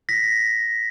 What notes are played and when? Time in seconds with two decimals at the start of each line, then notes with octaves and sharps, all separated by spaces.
0.09 A#6 B6